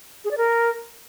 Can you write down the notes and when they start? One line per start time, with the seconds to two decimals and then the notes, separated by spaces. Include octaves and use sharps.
0.25 G#4
0.31 D5
0.38 A#4